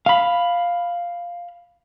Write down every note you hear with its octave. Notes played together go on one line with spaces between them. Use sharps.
F5 B5